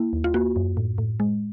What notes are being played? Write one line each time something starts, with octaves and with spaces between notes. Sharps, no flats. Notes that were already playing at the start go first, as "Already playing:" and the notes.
Already playing: A#3 E4
D#2
F4
A#3 F#4
F#2
A2
A2
G#3